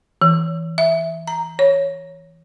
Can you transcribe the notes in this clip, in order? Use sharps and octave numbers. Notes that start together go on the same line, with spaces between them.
E3
E5
A#5
C#5